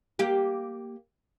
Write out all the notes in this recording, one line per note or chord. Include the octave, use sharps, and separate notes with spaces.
A#3 G4